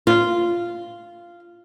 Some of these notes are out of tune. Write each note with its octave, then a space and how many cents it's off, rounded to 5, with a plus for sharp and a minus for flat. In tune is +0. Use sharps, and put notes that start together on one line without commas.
F4 -10